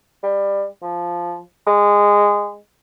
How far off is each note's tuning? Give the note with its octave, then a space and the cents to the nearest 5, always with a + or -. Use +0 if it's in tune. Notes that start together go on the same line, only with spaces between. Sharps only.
G3 +20
F3 -5
G#3 -15